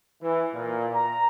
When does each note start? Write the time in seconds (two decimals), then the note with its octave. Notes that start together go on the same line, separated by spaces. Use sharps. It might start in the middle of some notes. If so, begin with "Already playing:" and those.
0.22 E3
0.53 A#2
0.93 A#5